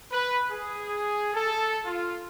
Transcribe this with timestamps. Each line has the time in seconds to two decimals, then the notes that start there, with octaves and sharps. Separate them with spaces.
0.12 B4
0.50 G#4
1.34 A4
1.85 F4